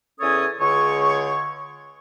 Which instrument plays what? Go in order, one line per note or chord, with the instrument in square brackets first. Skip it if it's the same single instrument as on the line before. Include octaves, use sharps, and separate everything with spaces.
[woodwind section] E2 C#4 A4 C#5 G#5 D#6
C#2 D3 G#4 C#5 C#6